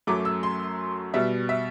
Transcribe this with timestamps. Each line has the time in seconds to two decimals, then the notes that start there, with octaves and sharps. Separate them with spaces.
0.07 F#2 F#3 A3 D6
0.25 E6
0.43 C6
1.14 B2 G3 E5
1.49 E5